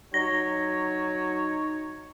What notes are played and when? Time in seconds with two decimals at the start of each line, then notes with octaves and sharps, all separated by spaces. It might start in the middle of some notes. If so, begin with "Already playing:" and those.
0.14 F#3 D#4 C#5 A#6